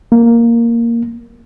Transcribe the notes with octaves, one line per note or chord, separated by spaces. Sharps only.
A#3